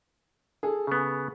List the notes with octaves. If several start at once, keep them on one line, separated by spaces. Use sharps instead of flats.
G#4 A4
C#3 B3